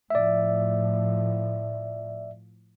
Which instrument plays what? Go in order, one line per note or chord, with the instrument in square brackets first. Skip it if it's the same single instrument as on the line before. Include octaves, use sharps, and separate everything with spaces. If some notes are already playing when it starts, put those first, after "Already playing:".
[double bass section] A2 F3 [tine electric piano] D5 E5